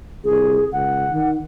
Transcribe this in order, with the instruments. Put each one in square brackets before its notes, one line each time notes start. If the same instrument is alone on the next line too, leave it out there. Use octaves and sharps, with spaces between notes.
[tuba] C2 [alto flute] G#4
[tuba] C#2 [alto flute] F#5
[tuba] D#3